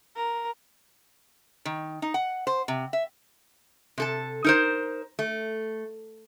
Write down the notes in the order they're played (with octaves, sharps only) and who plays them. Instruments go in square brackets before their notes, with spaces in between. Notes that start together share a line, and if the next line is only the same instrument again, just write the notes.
[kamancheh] A#4
[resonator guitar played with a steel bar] D#3
D#4
F#5
C5
C3
E5
C3 A4 A5
D#4 A#4 C5
A3